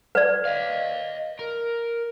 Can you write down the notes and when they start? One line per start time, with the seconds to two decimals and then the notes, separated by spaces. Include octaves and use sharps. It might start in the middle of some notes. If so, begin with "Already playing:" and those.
0.15 B4 D5
0.45 D#5 F5
1.39 A#4